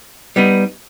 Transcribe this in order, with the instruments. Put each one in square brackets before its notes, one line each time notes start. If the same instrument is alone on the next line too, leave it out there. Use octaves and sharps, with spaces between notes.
[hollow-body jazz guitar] G3 B3 D#4